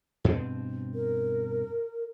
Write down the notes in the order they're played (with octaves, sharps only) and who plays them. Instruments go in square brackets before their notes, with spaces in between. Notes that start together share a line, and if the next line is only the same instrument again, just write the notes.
[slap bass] G2 B2 C4
[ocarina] A#4